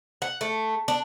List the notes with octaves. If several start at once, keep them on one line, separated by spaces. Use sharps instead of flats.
F#5
A3
D4